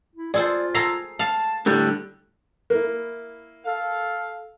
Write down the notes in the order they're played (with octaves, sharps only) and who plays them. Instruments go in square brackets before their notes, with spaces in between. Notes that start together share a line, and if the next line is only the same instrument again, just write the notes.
[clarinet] E4
[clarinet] F4 [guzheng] G#4 A4 C5 [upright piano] D5
[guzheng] G#4 A4 A#5 [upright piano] C7
[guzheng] F5 [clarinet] A5
[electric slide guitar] A2 D3 G3 [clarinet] D4
[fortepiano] A#3 E4
[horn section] A4 F5